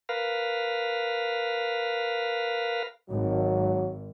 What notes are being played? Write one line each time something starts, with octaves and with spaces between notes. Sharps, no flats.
A#4 B4 F5
G#1 F#3